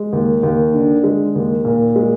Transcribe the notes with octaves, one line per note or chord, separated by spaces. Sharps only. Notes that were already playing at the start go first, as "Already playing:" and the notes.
Already playing: G#3
D#2
D#2
D3
G#3
D#2
A#2
G#3